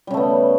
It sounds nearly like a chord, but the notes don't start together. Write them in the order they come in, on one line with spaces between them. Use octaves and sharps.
G3 C#3 A3 B3